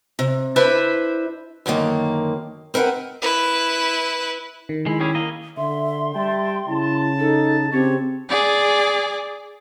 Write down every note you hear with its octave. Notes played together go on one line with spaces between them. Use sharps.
C3
D4 E4 B4 C5 E5
F#2 D3 D#3 A#3
C4 A#4 B4 F5 F#5
E4 B4
D#3
G#3 E4
G3 C#4 G#4
A#3 D#5
D3 E5 C6
G3 E5 G5 A5
C#3 E4 A5
D#4 A4
C#3 C4 G4 C#5
G#4 D5